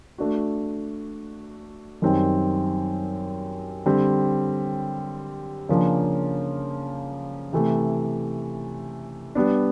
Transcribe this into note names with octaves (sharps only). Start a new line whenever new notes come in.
A3 D4 F#4
F#2 D#3 G3 C4 D#4
D3 G3 C4
C#3 F3 A#3 D4
C3 E3 A3
G3 B3 D4